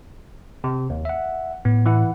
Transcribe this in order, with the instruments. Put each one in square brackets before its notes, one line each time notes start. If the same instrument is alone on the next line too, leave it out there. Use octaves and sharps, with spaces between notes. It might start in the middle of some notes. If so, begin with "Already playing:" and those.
[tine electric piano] C3
D#2
E5 F#5
[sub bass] A2 [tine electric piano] B3
[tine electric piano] E3 E4 F#5